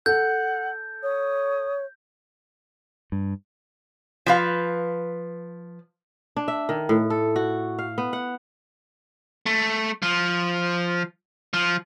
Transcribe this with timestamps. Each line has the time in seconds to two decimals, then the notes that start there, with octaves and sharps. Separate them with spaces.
0.06 A4 F#5 G6
1.03 C#5 D#6
3.12 G2
4.26 F3 B4 F5
6.37 D4
6.48 E5
6.69 D#3
6.89 A2
7.10 A4
7.36 F#4
7.79 F5
7.98 B3
8.13 F#5
9.46 A3
10.02 F3
11.53 F3